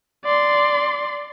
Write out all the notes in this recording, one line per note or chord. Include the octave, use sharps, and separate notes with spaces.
D5 C6